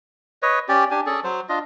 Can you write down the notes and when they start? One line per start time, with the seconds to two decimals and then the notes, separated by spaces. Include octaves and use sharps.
0.42 B4 C#5 D#5
0.69 C#4 G4 D5
0.91 D4 G4 G#5
1.06 C#4 G#4 A4 D5
1.24 F#3 C5
1.49 D4 F4 D#5